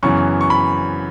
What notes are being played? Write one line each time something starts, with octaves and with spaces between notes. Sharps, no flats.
F#2 C#3 E3 B3 C#6
C#6
B5